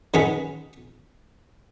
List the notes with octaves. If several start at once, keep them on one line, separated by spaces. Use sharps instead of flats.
D#3 F#3 C#4 G#4 B4